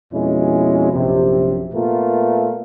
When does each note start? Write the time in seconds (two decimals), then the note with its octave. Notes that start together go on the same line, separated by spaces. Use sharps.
0.13 F2 B2 G#3 C#4 E4
0.93 A#1 F#2 C3
1.74 A#2 A3 B3 F4 A#4